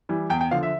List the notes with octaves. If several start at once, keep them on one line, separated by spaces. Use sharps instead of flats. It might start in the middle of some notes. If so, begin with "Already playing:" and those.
E3 G3
E2 G5
G5
D3 F3 F5
E5